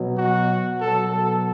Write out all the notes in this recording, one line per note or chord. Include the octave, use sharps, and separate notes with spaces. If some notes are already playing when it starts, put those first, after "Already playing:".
Already playing: B2 F#3
F#4
B2 F#3 A4
A4